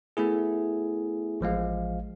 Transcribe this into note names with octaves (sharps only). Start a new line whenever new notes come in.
A3 B3 E4 G#4
A1 F3 G#3 F5